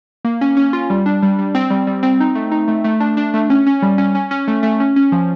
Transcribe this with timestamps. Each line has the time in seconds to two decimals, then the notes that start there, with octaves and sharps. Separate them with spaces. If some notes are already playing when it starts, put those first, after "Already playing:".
0.25 A#3
0.41 C#4
0.57 C#4
0.73 F4
0.90 G3
1.06 D4
1.23 G3
1.39 G3
1.55 C4
1.70 G3
1.87 G3
2.03 C4
2.20 D#4
2.35 A3
2.52 D#4
2.68 A3
2.84 A3
3.00 D4
3.17 D4
3.34 A3
3.50 C#4
3.67 C#4
3.82 G3
3.98 C#4
4.15 C#4
4.31 C#4
4.48 A3
4.63 A3
4.80 C#4
4.96 C#4
5.12 F3